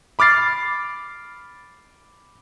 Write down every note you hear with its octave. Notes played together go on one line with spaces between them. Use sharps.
B5 D6 F6 A6 C7